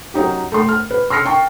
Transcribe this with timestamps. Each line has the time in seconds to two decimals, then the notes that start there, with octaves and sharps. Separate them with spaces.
0.14 F#3 C#4 D#4 G4
0.52 A3 C6
0.69 F6
0.91 B4
1.10 C6 E6 F6 A#6 C7 C#7
1.25 G5 A5 C#6